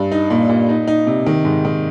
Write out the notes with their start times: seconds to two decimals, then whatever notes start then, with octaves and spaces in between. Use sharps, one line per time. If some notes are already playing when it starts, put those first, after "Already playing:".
Already playing: G2
0.12 D#4
0.30 A#2
0.49 A#2
0.69 D#4
0.87 D#4
1.07 C3
1.26 D#3
1.45 G#2
1.65 D#3